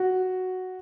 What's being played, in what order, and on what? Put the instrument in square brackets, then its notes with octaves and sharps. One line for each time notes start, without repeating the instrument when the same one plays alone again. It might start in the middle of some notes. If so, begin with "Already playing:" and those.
Already playing: [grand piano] F#4